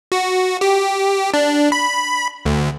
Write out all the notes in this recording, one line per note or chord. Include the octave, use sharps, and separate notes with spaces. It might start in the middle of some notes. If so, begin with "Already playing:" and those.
F#4
G4
D4
B5
D2